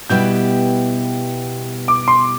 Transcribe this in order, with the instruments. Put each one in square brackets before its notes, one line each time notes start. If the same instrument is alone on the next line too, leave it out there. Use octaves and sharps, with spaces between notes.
[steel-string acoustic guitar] B2 G3 B3 E4 G4 [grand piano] G6
[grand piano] D6
C6